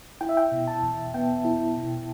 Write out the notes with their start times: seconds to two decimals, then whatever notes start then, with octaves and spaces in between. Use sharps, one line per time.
0.21 E4 G5
0.29 E5
0.37 G5
0.52 B2
0.67 A5
0.83 E2
1.14 B3 G5
1.45 E4
1.76 B2